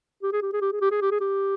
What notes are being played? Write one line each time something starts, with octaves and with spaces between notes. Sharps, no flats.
G4
G#4
G4
G#4
G4
G#4
G4
G#4
G4
G#4
G4